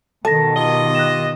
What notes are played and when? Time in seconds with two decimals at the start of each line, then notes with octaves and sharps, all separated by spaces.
0.25 B2 D#3 A4 A5 A#6
0.56 F4 G4 D#5 G7
0.95 F#6 A#6 E7